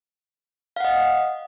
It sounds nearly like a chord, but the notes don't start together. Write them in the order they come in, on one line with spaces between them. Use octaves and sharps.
F5 F#5 D#5